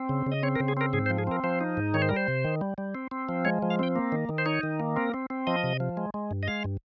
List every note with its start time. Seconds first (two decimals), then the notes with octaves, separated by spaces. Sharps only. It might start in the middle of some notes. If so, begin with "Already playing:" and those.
Already playing: C4
0.09 C#3
0.26 C#3
0.32 D#5
0.43 C4 C#5
0.56 A#4
0.60 C#3
0.68 G#4
0.77 C4 A#4
0.93 G#2 G#4
1.06 C5
1.10 F3
1.18 G#4
1.27 C4 A#4
1.44 F3 C5
1.61 D#4
1.77 G#2
1.94 D#3 C#5
2.02 C5
2.09 G3 A#4
2.16 C5
2.28 C3
2.45 D#3
2.61 G3
2.78 G3
2.95 C4
3.11 C4
3.29 F3
3.45 G#3 C#5
3.62 F3
3.70 F5
3.79 C4 G5
3.96 A#3
4.12 D#3
4.29 D#3
4.38 C5
4.46 D#4 C#5
4.63 D#3
4.80 A#3
4.96 C4 A#4
5.14 C4
5.30 C4
5.47 F3 D#5
5.64 C3
5.80 F3
5.97 G#3
6.14 G#3
6.31 G2
6.43 D#5
6.47 G#3 F5
6.64 G2